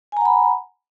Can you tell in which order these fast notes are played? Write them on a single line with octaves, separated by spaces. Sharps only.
G#5 A#5 F#5 B5